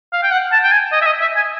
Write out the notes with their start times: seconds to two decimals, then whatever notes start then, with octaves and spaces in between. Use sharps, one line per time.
0.12 F5
0.23 G5
0.32 F#5
0.52 A5
0.63 G5
0.72 G#5
0.92 D#5
1.02 E5
1.06 D#5
1.21 E5
1.36 G#5